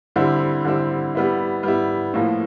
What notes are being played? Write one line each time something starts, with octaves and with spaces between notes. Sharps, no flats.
D3 G3 C4 E4
D3 G3 C4 E4
G3 B3 E4
G3 B3 E4
A2 F3 A#3